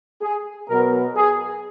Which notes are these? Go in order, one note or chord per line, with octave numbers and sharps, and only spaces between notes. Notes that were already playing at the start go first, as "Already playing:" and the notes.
G#4
B2 F#3 B3 A#4
G#4